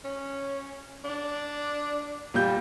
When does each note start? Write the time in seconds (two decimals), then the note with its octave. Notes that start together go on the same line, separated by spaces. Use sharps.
0.04 C#4
1.04 D4
2.34 A#2 G3 G6